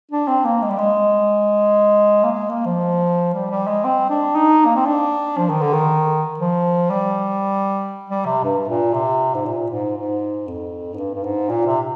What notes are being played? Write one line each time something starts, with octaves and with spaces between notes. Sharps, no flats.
D4
C4
A#3
G#3
G3
G#3
A#3
G#3
A#3
F3
G3
G3
G#3
C4
D4
D#4
A#3
C4
D4
F3
D#3
D3
D#3
F3
G3
G3
C3
G2
A#2
C3
G#2
A#2
G#2
G#2
F2
G#2
G2
G2
G#2
A#2
C3